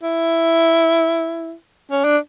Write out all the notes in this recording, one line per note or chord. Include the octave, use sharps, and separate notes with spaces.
E4
C#4
D4